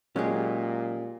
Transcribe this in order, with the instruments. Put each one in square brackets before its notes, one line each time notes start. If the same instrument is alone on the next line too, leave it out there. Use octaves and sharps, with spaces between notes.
[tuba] A#2 [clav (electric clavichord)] F#3 G#3 [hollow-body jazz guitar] C#4 G4 G#4